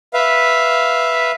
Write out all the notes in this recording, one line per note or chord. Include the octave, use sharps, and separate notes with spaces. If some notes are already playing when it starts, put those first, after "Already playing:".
B4 E5 F5